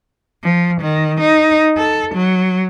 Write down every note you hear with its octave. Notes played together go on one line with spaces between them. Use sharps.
F3
D#3
D#4
A4
F#3